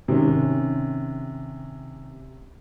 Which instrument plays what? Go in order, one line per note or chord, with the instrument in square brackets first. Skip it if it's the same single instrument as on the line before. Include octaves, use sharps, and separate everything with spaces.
[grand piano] C3 D#3 C#4